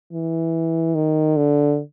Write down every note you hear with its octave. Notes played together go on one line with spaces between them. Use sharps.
E3
D#3
D3